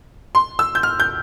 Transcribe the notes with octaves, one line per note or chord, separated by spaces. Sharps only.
C6
E6
G6
F6
G6